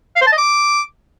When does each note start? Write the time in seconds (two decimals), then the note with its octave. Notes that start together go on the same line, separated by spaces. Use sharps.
0.16 F5
0.21 C5
0.27 A5
0.32 D#5
0.38 D6